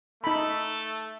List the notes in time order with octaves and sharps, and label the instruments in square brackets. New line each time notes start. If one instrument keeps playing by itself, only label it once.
[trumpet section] A3 A4 [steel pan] D#4 B5